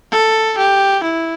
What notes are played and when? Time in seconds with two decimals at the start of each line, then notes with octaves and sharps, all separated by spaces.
0.12 A4
0.58 G4
1.04 E4